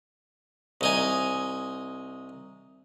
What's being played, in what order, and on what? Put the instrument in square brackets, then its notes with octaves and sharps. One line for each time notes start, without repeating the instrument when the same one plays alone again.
[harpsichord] C2 D#4 G#5